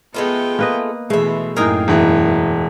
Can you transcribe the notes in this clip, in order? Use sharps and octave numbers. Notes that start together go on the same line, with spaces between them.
G#3 A3 B3 F4 G5
A#3 B4 D#5
B2 E3 G#3 A3 E5
F#2 A2 A#3 D#4 G#4 A#4 G5 G#5
E1 E3